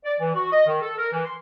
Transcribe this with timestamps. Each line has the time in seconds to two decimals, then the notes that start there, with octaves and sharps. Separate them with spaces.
0.04 D5
0.20 E3
0.35 F#4
0.52 D#5
0.67 D#3
0.82 A4
0.98 A#4
1.12 E3
1.25 C6